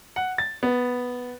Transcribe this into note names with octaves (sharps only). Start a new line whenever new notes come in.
F#5
A6
B3